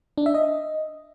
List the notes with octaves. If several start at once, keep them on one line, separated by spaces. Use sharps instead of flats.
D4
E5
D#5